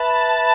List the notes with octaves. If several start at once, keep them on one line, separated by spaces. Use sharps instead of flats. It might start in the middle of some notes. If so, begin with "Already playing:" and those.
Already playing: B4 E5 A5 B5
A5